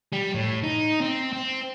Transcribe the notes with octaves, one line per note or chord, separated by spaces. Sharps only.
G3
A2
D#4
C4
C4